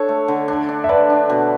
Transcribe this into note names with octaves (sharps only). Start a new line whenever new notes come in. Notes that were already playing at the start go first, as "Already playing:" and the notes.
Already playing: D4 A4 C#5
A3
D3
D4
D4
E5
D3 B4 D5
D4
B2